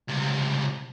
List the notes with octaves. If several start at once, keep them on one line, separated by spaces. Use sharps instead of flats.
C#2 C3